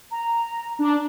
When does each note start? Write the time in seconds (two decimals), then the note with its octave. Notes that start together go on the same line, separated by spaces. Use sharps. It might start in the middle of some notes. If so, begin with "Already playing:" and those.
0.11 A#5
0.79 D4